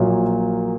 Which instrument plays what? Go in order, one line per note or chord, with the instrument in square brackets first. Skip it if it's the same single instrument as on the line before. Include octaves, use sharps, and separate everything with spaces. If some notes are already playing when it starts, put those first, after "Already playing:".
Already playing: [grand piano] A#1 A#2 F#3 A#3